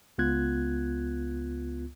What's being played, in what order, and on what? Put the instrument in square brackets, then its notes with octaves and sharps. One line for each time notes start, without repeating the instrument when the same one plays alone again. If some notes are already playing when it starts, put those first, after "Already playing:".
[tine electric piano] C#2 B3 F4 F#6 G#6